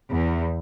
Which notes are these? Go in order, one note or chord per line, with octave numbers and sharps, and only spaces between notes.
E2